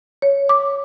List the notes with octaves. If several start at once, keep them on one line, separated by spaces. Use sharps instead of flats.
C#5
D6